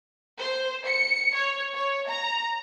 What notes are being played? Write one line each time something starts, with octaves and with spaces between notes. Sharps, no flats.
C5
C#7
C#5
C#5
A#5